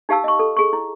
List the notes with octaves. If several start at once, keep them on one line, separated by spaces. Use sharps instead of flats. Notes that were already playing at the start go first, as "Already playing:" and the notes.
D#4 G4 F5 A5 E6
D#5 C#6
A4
G#4 C#6
E4